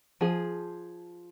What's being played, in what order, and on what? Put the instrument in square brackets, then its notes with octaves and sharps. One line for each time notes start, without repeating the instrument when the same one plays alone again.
[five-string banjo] F3 G#4